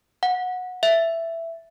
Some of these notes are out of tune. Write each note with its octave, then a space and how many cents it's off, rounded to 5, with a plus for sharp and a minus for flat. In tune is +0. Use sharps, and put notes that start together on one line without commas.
F#5 -20
E5 +10